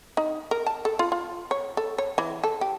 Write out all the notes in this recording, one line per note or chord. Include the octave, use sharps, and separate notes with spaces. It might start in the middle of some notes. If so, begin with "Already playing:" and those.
D#4
A#4
A5
A4
F4
F4
C#5
A4
C#5
E3
A4
G4